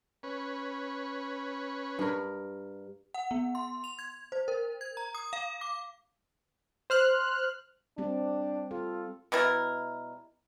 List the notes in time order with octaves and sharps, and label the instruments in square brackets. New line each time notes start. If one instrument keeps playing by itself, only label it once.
[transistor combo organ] C#4 B4
[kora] G2 A#4
[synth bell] F#5
B3
C6
F7
G#6
C5
A#4
G#6
A#5
D#6
F5
D6
[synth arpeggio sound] C5 F6 F#6
[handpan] G3 C4 G4 [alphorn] D4
[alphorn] F4 [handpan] A4
[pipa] B2 G3 E4 A#4